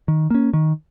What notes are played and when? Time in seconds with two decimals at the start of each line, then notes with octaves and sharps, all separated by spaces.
0.08 D#3
0.30 A#3 C#4
0.53 D#3